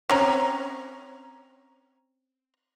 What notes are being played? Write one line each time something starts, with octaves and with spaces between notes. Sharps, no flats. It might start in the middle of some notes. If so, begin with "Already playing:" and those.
C4 C#4 A#5